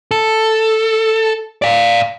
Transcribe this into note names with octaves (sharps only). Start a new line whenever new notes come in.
A4
D5 F5